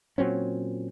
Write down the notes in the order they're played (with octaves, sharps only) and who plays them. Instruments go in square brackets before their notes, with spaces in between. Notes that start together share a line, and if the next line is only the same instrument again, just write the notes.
[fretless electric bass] A#2 F#3 C4 C#4